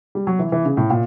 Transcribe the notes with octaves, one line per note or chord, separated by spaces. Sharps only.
G3
F#3
E3
E3
C#3
A2
A#2